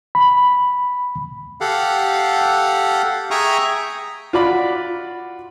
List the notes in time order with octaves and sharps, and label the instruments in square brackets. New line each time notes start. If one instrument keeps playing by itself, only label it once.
[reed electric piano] B5
[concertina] G4 A4 F5 F#5
G#4 E5 G5 A#5 C#6 D#6
[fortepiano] F4 F#4 D5 B5